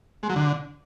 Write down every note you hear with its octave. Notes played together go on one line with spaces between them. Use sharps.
G#3
F#3
D3